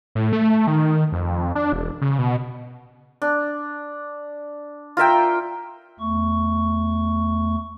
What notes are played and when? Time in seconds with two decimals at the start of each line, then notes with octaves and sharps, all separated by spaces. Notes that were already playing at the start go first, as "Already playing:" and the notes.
0.15 A2
0.33 A3
0.67 D#3
1.12 F2
1.55 D4
1.73 E1
2.01 C#3
2.18 B2
3.22 D4
4.97 F4 A#4 E5 G5
6.00 E2 A3 C#6